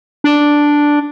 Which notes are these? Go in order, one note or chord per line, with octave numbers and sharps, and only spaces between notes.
D4